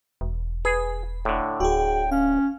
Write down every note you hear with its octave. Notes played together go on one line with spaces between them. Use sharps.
E1
G#4 B4
A2 D3
D1 F#4 G#4 G5
C#4 F5